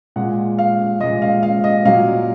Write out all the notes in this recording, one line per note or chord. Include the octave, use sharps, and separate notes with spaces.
A#2 G#3 F#5
F5
A#2 G#3 D#5
F5
F5
D#5
A#2 F#3 F5